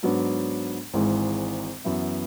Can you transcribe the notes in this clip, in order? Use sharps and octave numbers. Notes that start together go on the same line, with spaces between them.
G#2 F#3 B3 D4
G#1 G#2 E3 G#3
F#2 E3 B3 E4